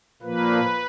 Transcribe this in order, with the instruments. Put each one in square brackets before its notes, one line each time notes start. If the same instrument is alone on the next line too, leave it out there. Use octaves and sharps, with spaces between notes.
[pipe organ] A#2 F3 A#3 B4